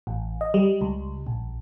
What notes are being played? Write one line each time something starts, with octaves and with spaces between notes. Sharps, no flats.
A1
D#5
G3
C#2
A#1